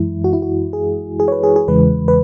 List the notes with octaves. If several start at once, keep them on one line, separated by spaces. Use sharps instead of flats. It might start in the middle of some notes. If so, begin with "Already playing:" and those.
Already playing: F#2 E3 G#3 E4
F#4
E4
F#4
G#4
G#4
C#5
B4
G#4
G#4
E2 C#3 E3 G#3 B4
B4